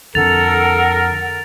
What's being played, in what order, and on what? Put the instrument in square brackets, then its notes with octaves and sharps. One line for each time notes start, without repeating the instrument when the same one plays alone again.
[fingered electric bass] F2 D3 [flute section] A4 F#5 [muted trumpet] A#4 [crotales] A6 F7